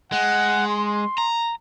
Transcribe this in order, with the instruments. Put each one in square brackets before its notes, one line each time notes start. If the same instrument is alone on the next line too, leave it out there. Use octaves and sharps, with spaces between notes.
[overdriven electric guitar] G#3 [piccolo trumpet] F#5
[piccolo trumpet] C6
[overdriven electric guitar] A#5